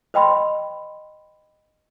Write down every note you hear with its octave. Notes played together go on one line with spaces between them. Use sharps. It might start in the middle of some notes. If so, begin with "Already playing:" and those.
C5 D#5 G5 B5 C6